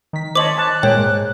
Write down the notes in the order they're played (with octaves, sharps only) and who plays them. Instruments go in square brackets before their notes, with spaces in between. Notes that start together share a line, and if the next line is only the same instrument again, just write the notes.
[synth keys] D#3 B6
[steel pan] C5 D#5 A5 [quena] C#5 [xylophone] D6 F#7
[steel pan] A5 [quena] F#6
[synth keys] A#2 G#3 [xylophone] C#5 [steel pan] G5
[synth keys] G#2